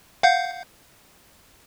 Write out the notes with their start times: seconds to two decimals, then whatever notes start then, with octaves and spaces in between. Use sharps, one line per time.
0.23 F5 F#5 G6